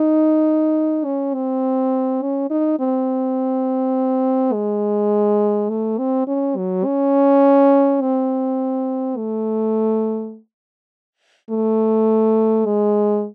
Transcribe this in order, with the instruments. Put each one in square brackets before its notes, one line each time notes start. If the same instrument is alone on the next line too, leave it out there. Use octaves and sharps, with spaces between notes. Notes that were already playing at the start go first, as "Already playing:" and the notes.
Already playing: [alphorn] D#4
C#4
C4
C#4
D#4
C4
G#3
A3
C4
C#4
F#3
C#4
C4
A3
A3
G#3